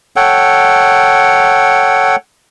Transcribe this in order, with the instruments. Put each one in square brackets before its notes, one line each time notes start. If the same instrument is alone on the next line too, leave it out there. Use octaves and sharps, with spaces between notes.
[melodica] A4 C#5 F#5 G5